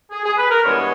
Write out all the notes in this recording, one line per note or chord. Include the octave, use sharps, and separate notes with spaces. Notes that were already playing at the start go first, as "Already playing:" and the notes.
G#4
G#4
B4
A#4
G2 E3 G#3 B3 C#5